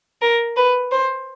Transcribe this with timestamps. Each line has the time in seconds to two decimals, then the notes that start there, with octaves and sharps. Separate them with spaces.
0.22 A#4
0.56 B4
0.91 C5